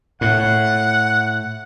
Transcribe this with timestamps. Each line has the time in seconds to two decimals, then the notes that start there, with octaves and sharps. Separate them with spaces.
0.21 A2 F#5